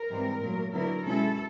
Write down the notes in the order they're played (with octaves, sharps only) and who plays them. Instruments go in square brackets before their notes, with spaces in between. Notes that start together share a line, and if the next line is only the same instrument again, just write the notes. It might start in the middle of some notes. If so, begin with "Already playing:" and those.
Already playing: [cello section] A#4
G#2 E3 G3 C4
A#2 F#3 A3
D3 F#3 B3 E4 A#4
B2 G#3 C#4 E4 A4